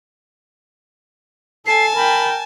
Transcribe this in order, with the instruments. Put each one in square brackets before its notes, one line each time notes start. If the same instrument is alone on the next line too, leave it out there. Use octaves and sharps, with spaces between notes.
[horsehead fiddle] A4 [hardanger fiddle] G#5 A5 [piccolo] C7
[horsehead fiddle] A#4 G5 [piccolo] B5